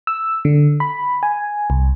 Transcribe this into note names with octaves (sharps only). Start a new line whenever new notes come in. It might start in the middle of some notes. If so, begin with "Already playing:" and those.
E6
D3
B5
G#5
C2